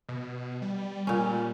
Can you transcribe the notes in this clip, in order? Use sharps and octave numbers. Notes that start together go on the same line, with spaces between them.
B2
G3
A#2 C#4